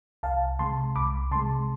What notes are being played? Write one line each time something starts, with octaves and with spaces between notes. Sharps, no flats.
C2 F5 A5
C3 G#3 A5 C6
C2 B5 D6
C3 G#3 A5 C6